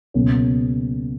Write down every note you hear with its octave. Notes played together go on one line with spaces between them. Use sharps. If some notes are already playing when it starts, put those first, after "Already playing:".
C#2 B2 F#3 A#3 C#4